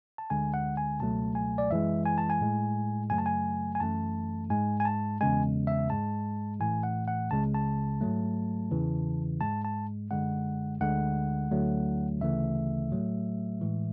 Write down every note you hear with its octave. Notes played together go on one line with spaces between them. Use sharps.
A5
D2 D3 G#3 G#5
F#5
G#5
C#2 B2 F#3 A3 A5
G#5
D5
F#2 E3 G#3 E5
G#5
A5
G#5
A2 G#3
F#2 C#3 F#3 A3 G#5
A5
G#5
G#5
F#2 E3 A3 A5
G#2 G#3 G#5
G#5
A5
E2 C#3 G#3 G#5
E5
G#2 G#3 A5
A2 E3 A3 G#5
F#5
F#5
C#2 C#3 G#3 A5
A5
G#2 F#3 A3
E2 C#3 E3
G#2 G#3 A5
A5
F#2 D3 G#3 F#5
D2 D3 G#3 F#5
D2 D3 F#3 A3
D2 C#3 E3 A3 E5
A2 F#3 A3
A2 E3 G#3